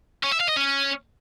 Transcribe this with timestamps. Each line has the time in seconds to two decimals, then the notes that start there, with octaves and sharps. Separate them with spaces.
0.23 C#4
0.32 E5
0.40 F5
0.48 D#5
0.56 C#4